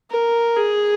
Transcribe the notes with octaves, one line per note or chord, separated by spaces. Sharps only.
A#4
G#4